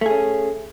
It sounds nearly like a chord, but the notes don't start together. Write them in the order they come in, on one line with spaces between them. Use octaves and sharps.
A3 G#4 C#4